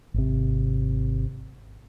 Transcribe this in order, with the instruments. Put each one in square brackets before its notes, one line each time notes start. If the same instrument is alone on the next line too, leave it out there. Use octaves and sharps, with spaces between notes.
[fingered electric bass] G#1 C3